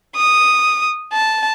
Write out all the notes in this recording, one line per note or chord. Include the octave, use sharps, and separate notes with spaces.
D#6
A5